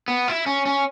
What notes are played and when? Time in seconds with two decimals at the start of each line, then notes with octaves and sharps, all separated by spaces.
0.08 B3
0.28 E4
0.46 C#4
0.66 C#4